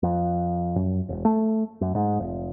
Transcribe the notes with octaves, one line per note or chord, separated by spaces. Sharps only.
F2
F#2
E1
A3
F#2
G#2
F1